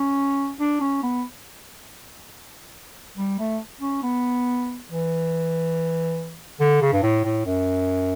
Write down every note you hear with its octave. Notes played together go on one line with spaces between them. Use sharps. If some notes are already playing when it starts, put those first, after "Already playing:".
Already playing: C#4
D4
C#4
B3
G3
A3
C#4
B3
E3
D3
C#3
G2
A2
A2
F#2